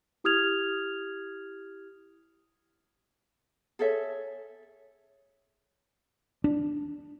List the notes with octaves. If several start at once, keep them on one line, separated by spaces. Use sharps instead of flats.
E4 G4 D#6 F6 G#6 F7
G#4 A4 C#5 E5
D4